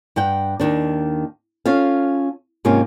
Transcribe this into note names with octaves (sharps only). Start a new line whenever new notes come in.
G2 F#5 G5
D#2 D#3 D4
C#4 F4 A4 F5
G#2 C3 A#3 C#4 F4